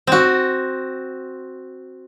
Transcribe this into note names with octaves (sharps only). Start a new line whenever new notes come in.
C4 F#4